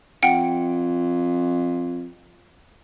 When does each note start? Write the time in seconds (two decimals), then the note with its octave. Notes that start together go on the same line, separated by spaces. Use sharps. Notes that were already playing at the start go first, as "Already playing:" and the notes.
0.23 F2 F#5 G5